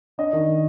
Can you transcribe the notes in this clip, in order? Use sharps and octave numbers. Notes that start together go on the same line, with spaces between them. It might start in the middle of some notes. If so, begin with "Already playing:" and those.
D4 D#5
D#3